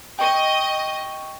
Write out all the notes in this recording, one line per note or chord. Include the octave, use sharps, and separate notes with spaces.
D#5 G5 C#6